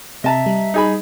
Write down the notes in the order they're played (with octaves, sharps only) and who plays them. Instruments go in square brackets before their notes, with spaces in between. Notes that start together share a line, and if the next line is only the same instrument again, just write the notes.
[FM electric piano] C3 [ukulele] D#5 A5 A#5 [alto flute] E5
[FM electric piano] G3
[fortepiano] D#4 G#4 B5